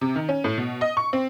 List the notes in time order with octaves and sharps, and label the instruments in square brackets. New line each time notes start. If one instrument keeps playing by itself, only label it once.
[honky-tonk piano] C3
D#3
C#4
A2
B2
D#5
C#6
C4